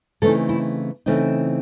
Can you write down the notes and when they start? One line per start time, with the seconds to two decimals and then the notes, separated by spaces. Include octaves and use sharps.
0.22 C#3 E3 A3 C4 D#4 A4
0.49 E4
1.06 C#3 E3 A3 C4 D#4